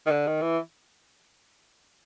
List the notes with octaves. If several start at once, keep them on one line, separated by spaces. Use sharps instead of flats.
D#3
D3
D#3
E3